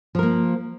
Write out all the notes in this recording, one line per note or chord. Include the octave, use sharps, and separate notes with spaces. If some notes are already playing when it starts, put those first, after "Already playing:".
F3 A#3 A#4